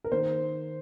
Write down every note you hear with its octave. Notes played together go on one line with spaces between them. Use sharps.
A#4
D#3 A#3 C5